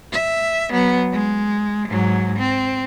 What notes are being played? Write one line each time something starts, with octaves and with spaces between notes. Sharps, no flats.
E5
F#3 B3
G#3
G#2 F#3
C4